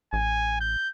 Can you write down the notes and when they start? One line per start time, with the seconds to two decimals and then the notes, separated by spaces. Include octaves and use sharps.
0.13 A1 G#5
0.61 G6